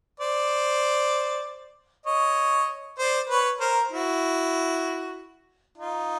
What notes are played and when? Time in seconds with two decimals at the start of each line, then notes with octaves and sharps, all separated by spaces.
0.20 C5 D5
2.06 C#5 D#5
2.99 C5 D5
3.29 B4 C#5
3.60 A#4 C5
3.91 E4 F#4
5.78 D#4 F4